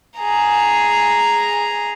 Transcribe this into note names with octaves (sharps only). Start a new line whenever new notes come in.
G#4 A#5